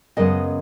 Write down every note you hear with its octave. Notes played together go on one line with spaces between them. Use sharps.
F#2 C#3 G#3 B3 D#5